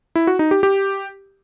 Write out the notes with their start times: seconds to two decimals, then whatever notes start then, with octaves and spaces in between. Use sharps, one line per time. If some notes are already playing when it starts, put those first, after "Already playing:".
0.15 E4
0.27 F#4
0.39 D#4
0.51 G4
0.63 G4